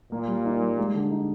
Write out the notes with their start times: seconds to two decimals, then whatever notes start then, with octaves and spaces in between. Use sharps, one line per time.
0.12 A#2 A#3
0.28 G3
0.45 D#4
0.61 G3
0.79 G#3
0.95 D3
1.11 D#4